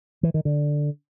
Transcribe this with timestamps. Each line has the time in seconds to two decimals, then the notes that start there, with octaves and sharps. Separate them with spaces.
0.23 E3
0.34 D#3
0.45 D3